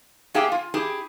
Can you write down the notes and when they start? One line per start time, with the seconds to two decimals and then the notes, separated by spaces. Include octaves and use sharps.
0.34 A#3 G4 G#4 E5 F5 G5
0.52 F4
0.74 E4 G4 G#4